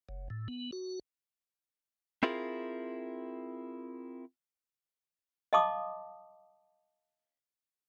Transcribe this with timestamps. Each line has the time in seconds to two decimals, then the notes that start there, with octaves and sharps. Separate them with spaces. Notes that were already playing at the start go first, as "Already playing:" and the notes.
0.09 F#1
0.30 A2
0.48 B3
0.73 F#4
2.23 C4 E4 F4 G#4 A#4
5.53 D#5 F5 A5 C6 D6 D#6